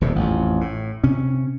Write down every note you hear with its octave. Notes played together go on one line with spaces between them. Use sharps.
D#1 E2 C3
A1 F2
A2
C3 C#4